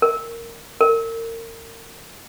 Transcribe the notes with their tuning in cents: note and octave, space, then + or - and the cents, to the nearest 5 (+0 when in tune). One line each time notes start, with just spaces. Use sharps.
A#4 -15
A#4 -35